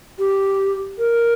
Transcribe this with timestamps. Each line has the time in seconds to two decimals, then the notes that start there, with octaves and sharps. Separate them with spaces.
0.19 G4
0.98 A#4